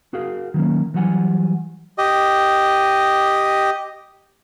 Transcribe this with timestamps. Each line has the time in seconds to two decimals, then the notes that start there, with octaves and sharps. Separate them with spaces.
0.13 F#4 G#4 A#4 F5
0.54 D#3 F#3 A3 A#3 C#4
0.94 E3 F#3 G3 F#5 G#5
1.98 G4 D#5